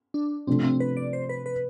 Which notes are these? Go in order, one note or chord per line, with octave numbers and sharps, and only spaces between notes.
D4
C3 F3 A3 C4 D4
C4
B4
D5
C5
B4
B4